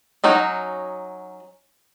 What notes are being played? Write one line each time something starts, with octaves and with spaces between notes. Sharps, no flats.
F#3 C#4 D#4 F#4